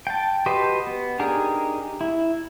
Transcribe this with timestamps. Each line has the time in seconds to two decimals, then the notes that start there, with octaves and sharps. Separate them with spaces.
0.07 G5 A5
0.46 F#4 G4 B4 C5 D#5
0.87 B3
1.19 D4 D#4 G4 G#4 A#4
2.01 E4